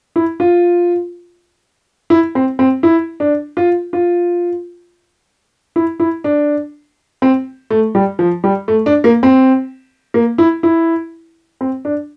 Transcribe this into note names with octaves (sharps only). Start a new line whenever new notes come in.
E4
F4
E4
C4
C4
E4
D4
F4
F4
E4
E4
D4
C4
A3
G3
F3
G3
A3
D4
A#3
C4
A#3
E4
E4
C4
D4